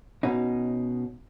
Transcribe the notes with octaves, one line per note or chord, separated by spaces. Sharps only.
B2 C#4 D#4